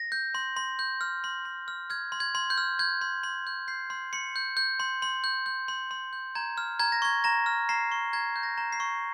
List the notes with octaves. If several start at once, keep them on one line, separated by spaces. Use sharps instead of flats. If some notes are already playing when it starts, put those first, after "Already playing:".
Already playing: A#6
G6
C6
C6
G6
F6
C6
C6
F6
F6 G#6
C6
G#6
C6
G6
F6
G6 G#6
C6
C6
G6
G6 C7
C6
C6 C#7
G6
G6
C6
C6
G6
G6
C6
C6
G6
A#5 G#6
F6
A#5 G#6
A#6
C#6 G#6
A#5 A#6
F6
A#5 C7
C#6
A#5 G#6
G6
A#6
A#5
C7
C#6